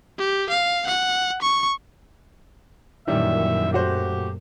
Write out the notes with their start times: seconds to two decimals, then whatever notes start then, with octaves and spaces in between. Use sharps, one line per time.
0.18 G4
0.49 F5
0.87 F#5
1.42 C#6
3.07 F#2 A#2 D#3 E3 G3 E5
3.73 A3 F#4 G4 C5